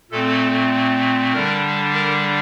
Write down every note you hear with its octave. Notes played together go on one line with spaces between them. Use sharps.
A#2 A3 C4 A4
D3 G3 D4 A#4
A#4